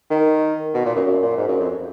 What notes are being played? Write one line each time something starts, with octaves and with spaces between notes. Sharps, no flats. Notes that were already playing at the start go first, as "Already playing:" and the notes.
D#3
B2
A#2
F#2
F#2
A#2
G#2
F#2
F2